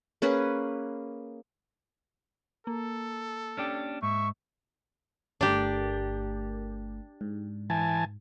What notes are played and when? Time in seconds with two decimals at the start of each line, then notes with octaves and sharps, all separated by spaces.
0.22 A#3 C#4 G#4 B4
2.67 A#3 A4
3.58 C#4 D4 G4
4.03 G#2 E5 C#6
5.41 G1 A3 D4 G4 A#4
7.21 G#2
7.70 E3 G#5 A5